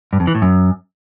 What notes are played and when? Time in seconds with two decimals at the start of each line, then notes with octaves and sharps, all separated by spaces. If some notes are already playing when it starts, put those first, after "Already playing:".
0.13 G2
0.20 F2
0.27 E3
0.35 A2
0.42 F#2